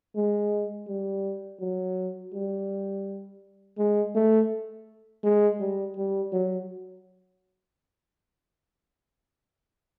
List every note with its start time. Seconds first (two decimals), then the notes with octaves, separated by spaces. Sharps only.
0.15 G#3
0.87 G3
1.60 F#3
2.34 G3
3.78 G#3
4.15 A3
5.23 G#3
5.59 G3
5.96 G3
6.32 F#3